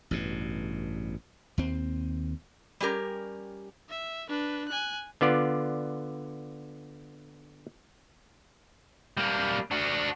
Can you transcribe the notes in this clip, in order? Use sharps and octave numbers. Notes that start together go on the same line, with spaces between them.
A1 G2 B2
D#2 C4
G3 C#4 G4 A#4
E5
D4 B4
G#5 F#6
D3 B3 F4 D5
G3 A#3
D4 F#4